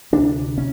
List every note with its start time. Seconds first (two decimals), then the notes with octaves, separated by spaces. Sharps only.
0.13 D2 C3 D4
0.58 C#4